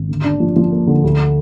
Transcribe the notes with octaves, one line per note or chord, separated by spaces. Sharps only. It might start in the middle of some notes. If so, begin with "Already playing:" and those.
Already playing: G#1
D3
D4
F3
F3
A#3
D3
D2